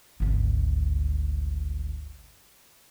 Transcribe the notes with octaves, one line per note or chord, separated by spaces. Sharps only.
G#1 D2